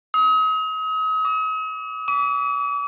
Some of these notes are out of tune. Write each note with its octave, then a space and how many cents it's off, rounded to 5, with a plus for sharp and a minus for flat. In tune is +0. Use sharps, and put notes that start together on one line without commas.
D#6 +40
D6 -30
D6 -40